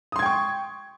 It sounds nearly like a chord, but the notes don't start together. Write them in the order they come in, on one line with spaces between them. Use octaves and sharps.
D#6 C6 G#6 G5 C#6